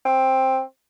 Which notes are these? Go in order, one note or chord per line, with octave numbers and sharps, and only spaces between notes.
C4